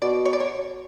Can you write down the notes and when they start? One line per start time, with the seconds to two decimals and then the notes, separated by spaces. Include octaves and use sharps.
0.02 B2 D5
0.25 C#5
0.33 D5
0.40 C#5